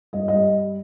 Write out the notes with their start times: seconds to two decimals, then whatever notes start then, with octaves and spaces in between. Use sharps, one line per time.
0.13 G2 D#5
0.28 G3 D#5